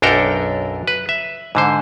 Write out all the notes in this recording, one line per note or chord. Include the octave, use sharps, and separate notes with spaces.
B1 F#2 D4 A4 A#4 G5
B4
E5
G#2 D3 C5